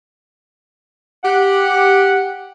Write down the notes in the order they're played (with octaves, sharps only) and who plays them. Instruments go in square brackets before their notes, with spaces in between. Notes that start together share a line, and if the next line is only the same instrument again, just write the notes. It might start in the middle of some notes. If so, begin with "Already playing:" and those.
[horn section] G4 F#5